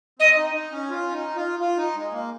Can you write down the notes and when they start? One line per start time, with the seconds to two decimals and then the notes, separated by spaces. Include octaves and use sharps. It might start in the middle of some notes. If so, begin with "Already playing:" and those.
0.19 C4 D#5
0.37 D#4
0.55 D#4
0.72 C#4
0.90 F4
1.08 C#4
1.12 D#4
1.36 F4
1.59 F4
1.77 D#4
1.95 G#3
2.12 A#3